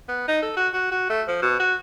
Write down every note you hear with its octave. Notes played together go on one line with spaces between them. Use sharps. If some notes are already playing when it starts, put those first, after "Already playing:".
B3
D#4
A4
F#4
F#4
F#4
A3
F3
B2
F#4